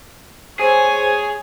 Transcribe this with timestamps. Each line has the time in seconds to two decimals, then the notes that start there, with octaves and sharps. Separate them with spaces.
0.59 G#4 C5 C#5 G#5